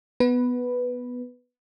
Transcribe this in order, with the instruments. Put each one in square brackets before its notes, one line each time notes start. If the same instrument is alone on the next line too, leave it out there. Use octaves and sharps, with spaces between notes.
[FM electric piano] B3 B4